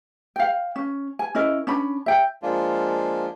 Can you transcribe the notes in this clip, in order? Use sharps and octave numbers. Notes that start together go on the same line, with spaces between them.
F5 G5
C#4
G#5
C#4 E4 A#4 D#5
C#4 D4 B5
E5 G5
F3 G#3 A#3 D4 F4